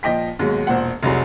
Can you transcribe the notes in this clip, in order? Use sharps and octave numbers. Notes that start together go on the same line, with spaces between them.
A#2 F3 D#5 G5 B6
D#2 G#2 B2 F#3 G#3
E1 A#2 C5 F#5
F1 C2 F#3 G#4